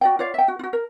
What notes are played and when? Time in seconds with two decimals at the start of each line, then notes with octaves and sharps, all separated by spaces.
0.01 F#4 D5 G5
0.19 F4 C#5 D5 F5
0.34 E5 G5
0.48 F#4
0.59 F4 F#4
0.73 A#4